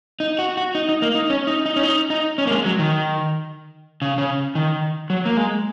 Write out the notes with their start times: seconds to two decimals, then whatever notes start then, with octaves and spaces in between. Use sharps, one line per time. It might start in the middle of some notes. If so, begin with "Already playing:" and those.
0.20 D#4
0.39 F#4
0.57 F#4
0.75 D#4
0.89 D#4
1.02 A#3
1.15 D#4
1.30 C#4
1.47 D#4
1.66 D#4
1.76 C#4
1.83 D#4
2.10 D#4
2.38 C#4
2.47 A#3
2.51 G#3
2.65 F#3
2.79 D#3
4.02 C#3
4.18 C#3
4.55 D#3
5.10 F#3
5.26 A#3
5.37 G#3